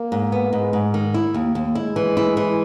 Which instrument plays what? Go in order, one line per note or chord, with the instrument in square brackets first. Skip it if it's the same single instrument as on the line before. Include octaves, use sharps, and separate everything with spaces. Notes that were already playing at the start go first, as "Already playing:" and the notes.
Already playing: [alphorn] A#3
[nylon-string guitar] G#2
B3
[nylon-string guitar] G#2 [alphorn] G#3
[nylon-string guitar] G#2
D#3
E4
D#2
D#2
[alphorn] G#3 [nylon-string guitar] E4
[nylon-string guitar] E3
E4
E3